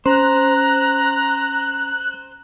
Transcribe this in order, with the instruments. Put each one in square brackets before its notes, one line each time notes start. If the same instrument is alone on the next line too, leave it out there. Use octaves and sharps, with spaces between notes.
[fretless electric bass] C#4 [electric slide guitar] C5 [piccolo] A#5 [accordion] F#6